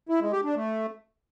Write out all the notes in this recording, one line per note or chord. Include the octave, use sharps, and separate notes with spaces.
E4
G#3
G4
D4
A3